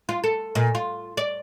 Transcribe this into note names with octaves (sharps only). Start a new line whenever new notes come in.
F4
A4
A#2
F4
D5